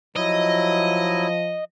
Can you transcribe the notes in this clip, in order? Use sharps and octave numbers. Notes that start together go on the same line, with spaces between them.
F3 F#3 E4 D#5